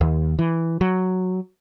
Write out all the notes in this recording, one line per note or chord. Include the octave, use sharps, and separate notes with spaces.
D#2
E3
F#3